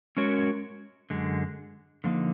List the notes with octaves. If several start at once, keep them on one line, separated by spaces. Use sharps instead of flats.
G#3 C#4 F#4 A#4 C#5
F#2 D3 G#3
D3 F3 A#3 D#4